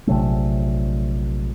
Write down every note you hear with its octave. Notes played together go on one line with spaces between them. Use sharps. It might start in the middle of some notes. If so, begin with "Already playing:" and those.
A#1 C3 F#3 A3